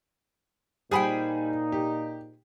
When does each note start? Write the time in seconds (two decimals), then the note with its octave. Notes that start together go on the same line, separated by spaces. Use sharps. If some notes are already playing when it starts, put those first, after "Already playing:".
0.91 A#2 G3 D#4 G#4 C5 G5 G#5 B5
1.72 G4